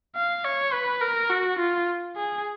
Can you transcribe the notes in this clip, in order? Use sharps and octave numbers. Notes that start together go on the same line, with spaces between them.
F5
C#5
B4
A#4
F#4
F4
G#4